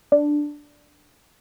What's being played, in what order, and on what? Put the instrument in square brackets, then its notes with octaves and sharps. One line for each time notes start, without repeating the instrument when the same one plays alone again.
[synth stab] D4